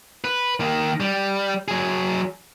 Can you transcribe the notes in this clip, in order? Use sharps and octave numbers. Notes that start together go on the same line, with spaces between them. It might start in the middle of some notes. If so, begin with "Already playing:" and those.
B4
D#3 A#3
G3
F#3 G#4